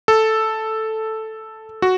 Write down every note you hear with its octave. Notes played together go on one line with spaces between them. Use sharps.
A4
F#4